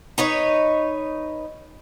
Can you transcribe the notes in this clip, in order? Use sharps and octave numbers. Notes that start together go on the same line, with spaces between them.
D#4 B4 C#5